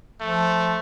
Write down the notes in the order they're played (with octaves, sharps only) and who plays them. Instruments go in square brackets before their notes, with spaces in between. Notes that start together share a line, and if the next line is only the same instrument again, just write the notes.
[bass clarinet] F3 [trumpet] A3